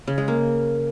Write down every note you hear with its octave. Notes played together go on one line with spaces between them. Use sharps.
C#3
G#3
A#3